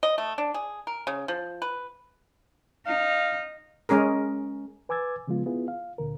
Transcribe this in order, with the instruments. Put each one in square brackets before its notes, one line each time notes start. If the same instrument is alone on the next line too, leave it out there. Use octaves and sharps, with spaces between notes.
[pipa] D#5
A3
D4
G#4
A#4
C#3
F3
B4
[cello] D#4 [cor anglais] F5
[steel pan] G#3 C#4 G#4 A#4
[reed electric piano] B4 G#5 D6 E6 G#6 A6
C#3 F3 G#3 B3 F4
B3 E4 F4 G#4
F5
D2 A#2 D3 A#4